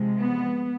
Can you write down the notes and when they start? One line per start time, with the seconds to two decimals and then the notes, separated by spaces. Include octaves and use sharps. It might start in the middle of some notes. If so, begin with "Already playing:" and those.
Already playing: C3 F3 G#3
0.18 B3